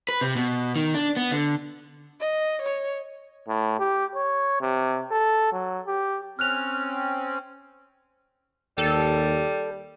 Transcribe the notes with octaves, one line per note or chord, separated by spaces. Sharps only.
B4
C3
B2
D#3
D4
B3
D3
D#5
C#5
A2
G4
C#5
C3
A4
F#3
G4
C4 C#4 F6 F#6 F7
D#2 G3 A4